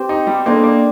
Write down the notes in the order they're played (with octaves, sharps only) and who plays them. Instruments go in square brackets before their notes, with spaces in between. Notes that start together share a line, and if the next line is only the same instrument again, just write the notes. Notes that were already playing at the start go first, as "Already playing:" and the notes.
Already playing: [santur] C4 G4 C5
[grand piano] D#4
G3
[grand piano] A#3 [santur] D4 A4 C5 D#5
[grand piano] A#3